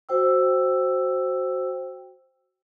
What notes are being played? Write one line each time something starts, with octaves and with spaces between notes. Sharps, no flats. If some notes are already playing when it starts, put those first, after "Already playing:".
F#4 C5 G5 E6